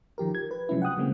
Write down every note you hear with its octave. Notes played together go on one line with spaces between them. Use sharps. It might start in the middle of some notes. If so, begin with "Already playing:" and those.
D#3 F3 G4 A#4
G#6
B4
C3 F3 F#3 G#3 C#4 E4
F#5 G5 D#6 F#6
C#3 G3 G#3 A#3 C4